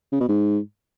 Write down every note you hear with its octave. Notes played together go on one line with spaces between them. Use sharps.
C#3
B2
G#2